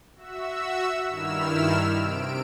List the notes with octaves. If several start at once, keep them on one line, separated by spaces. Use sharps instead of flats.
F#4 E5 E6
G2 D#3 E4 E6 F6 E7
C3 D7